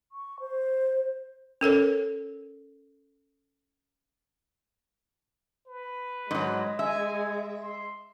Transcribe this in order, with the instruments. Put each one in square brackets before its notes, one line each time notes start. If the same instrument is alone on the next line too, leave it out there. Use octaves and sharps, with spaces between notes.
[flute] C#6
C5
[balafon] C#4 A4 A#4 C#5
[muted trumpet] B4
[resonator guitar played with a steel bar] G#2 F#3 [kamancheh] G#3
[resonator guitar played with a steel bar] E5 [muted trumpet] G#5
[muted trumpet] C6